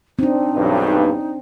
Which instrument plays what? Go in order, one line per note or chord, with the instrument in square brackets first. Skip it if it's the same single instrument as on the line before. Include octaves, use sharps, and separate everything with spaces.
[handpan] C4 D4 [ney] D#4
[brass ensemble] B1 E2 G2